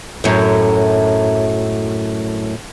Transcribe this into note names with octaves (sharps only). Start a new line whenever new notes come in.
F#2 A2